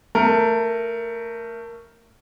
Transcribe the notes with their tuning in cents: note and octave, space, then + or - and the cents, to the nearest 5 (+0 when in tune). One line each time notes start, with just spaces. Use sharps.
A3 +20 A#4 +0